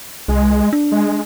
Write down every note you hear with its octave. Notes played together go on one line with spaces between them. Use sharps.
C2 G#3
D4
G#3